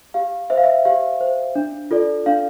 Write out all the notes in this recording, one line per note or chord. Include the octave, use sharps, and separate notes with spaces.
G4 F5
C5 E5
F5
E5
G4 F5
C5
D4
F4 A4 D5
D4 F5